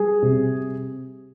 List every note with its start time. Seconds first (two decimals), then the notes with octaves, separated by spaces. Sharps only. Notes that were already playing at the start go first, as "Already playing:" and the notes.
Already playing: G3 G#4
0.22 C3